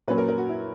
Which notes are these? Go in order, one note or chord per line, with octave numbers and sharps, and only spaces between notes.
A#2 F#3 A#3 C#4 B4
A#4
A#4
F#4
E4